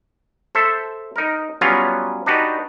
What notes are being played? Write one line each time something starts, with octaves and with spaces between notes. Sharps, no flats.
A4 C5 E5
D#4 A#4
F#3 G3 B3 C#4 F4
D4 D#4 F#4 G4 B4